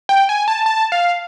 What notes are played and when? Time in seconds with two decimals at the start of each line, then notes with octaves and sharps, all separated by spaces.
0.09 G5
0.29 G#5
0.48 A5
0.66 A5
0.92 F5